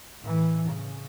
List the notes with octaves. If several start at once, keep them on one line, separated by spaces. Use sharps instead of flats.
A2 E3
C#3